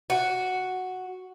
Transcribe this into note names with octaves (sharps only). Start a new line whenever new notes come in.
F#4